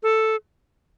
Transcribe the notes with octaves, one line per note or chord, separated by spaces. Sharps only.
A4